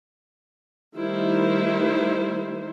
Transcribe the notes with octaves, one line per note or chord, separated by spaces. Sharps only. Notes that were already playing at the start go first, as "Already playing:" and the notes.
D#3 G3 A3 E4 C5